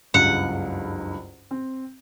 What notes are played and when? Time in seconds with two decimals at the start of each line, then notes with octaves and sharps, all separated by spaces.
0.14 F#1 C#2 G2 F#5
1.51 C4